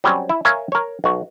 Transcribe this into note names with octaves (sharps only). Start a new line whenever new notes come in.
F#3 G3 C4 C#4
E4
A#4 C#5 E5 F5 G#5
A#4 C#5
B1 F#4